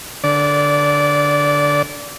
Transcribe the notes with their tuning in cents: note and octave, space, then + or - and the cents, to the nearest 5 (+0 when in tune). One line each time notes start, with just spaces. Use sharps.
D3 +0 D5 -20